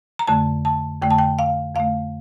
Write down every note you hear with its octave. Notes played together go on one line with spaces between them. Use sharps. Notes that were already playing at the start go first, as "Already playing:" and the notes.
A#5
F2 D3 A3 A5
A5
F2 D3 A3 G5
A5
G5
F5
F2 D3 A3 F5